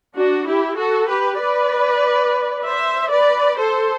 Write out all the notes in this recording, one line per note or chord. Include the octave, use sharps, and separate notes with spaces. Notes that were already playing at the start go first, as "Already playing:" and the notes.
D4 F#4
E4 G4
F#4 A4
G4 B4
B4 D5
C5 E5
B4 D5
A4 C5